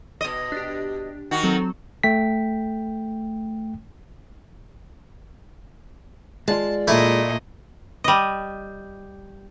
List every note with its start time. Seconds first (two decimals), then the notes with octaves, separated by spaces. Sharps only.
0.21 B2 D#5
0.52 D4 G4
1.31 D#3 F#4
1.43 F#3 C4 A4
2.03 A3 G5 B6
6.48 G#3 F4 D5 A5
6.88 A#2 A3 E4 D#5
8.04 G3 D#5